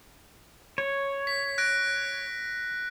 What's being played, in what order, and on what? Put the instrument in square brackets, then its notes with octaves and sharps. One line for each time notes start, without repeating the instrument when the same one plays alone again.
[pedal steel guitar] C#5
[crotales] B6
F#6 A#6 D7